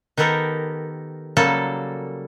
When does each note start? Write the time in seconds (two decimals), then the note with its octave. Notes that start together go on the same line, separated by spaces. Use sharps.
0.17 D#3 B3 G4 A4 A#4
1.37 C#3 F#3 G3 A#3 A4